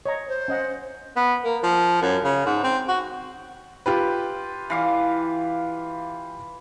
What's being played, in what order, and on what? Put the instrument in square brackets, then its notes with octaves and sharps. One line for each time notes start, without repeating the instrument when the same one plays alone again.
[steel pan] C#5 D#5 A#5
[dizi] C5
[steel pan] C#4 D#5 F#5
[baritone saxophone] B3
A#3
F3
F#2
C#3
G#2
C4
F#4
[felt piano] F4 G4 B4
[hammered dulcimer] E3 F5 D6